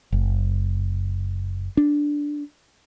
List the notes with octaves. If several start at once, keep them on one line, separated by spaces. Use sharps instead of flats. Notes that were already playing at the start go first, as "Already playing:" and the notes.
F#1
D4